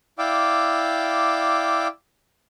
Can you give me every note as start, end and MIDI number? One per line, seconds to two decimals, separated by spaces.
0.19 1.87 64
0.19 1.87 74
0.19 1.87 77
0.19 1.87 79
0.19 1.87 86
0.19 1.87 88